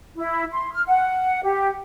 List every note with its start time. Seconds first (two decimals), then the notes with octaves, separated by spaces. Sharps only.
0.17 E4
0.52 C6
0.73 F6
0.87 F#5
1.43 G4